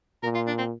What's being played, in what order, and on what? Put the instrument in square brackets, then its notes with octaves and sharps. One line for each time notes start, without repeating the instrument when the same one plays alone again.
[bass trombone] A#2 [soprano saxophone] A#4
[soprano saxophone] F4
D4
C4